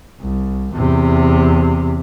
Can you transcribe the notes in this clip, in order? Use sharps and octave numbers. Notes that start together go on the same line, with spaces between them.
C2
E2 C3